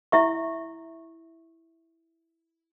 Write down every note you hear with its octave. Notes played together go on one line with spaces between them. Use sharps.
E4 E5 C#6